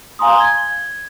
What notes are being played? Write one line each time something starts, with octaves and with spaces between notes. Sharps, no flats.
F5 G#5 A#5 C6 D#6
G#6 G7